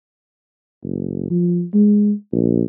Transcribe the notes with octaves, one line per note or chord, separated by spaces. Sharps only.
F#1
F3
G#3
A#1